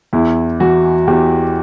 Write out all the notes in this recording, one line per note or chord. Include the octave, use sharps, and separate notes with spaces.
E2 E4
E3 F#4
E2 G4